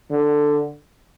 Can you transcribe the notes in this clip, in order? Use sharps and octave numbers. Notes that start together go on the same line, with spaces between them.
D3